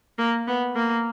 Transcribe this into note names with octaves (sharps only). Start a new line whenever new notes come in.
A#3
B3
A#3